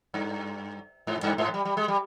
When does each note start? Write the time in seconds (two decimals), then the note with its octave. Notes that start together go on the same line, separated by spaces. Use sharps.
0.14 G2
1.07 G#2
1.23 G2
1.38 G#2
1.54 G3
1.65 G3
1.77 G#3
1.88 G3